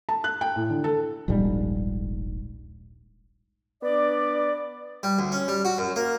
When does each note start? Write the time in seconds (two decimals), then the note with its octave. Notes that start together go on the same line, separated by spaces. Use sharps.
0.09 A5
0.24 F#6
0.41 G5
0.56 A2
0.69 D3
0.84 A4
1.28 D#1 A#1 G#2 G3
3.83 B3 D4 D5
5.03 G3
5.19 D2
5.32 C#4
5.48 G3
5.65 F#4
5.78 F#2
5.96 A#3